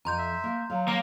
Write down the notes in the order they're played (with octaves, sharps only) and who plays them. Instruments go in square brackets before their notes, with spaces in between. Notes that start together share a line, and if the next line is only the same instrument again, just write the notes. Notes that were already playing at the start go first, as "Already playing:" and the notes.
[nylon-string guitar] F2 [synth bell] A#5 C6 G6
[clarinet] E5
[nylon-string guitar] A#3
[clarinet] F#3 [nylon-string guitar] F5
[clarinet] F#3 [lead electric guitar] A#3 [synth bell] F7